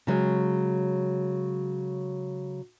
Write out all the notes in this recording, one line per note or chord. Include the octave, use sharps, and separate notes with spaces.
C#3 F#3 G#3